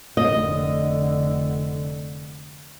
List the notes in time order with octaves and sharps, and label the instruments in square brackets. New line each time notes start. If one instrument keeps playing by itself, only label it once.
[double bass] F1 D3 [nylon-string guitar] D#5